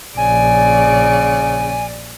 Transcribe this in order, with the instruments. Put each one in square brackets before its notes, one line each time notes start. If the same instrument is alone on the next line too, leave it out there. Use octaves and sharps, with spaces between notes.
[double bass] A#1 [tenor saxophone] C#3 [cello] D5 [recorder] G#5